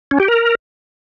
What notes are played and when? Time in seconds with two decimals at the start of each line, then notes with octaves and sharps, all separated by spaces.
0.11 C#4
0.20 G4
0.28 A#4